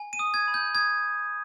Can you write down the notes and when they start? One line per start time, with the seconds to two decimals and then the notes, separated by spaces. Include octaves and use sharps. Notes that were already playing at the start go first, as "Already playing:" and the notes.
Already playing: G#5
0.13 D#7
0.19 D#6
0.34 G#6
0.48 B5
0.54 G6
0.75 D#6 G#6